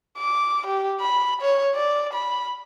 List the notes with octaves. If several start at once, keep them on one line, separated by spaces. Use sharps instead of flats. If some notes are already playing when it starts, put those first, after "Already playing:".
D6
G4
B5
C#5
D5
B5